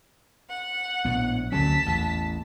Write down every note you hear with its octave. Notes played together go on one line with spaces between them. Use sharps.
F#5
A#1 A2 B3
D2 D3 F#3 C#4 A5 B6
A1 E2